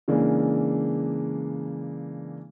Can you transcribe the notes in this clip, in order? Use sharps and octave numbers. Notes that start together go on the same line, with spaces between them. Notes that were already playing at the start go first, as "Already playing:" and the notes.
C#3 E3 G#3 A#3 D4